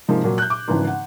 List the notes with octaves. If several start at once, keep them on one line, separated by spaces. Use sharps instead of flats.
G#2 C3 F3 G#3 A#3
A#2 F#3
F#6 G6
D6
G#1 C#3 E3 F3
F#5